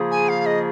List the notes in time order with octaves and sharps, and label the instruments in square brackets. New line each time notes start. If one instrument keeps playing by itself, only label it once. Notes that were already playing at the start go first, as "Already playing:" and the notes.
Already playing: [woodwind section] C#3 F3 A#3 F4 G#4
[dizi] G#5
F5
D#5